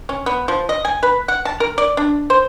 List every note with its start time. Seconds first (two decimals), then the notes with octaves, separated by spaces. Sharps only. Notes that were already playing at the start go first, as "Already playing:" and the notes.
0.09 C#4
0.26 B3
0.48 F3
0.69 D#5
0.85 G#5
1.03 B4
1.28 F#5
1.45 A5
1.60 A#4
1.78 D5
1.97 D4
2.30 C5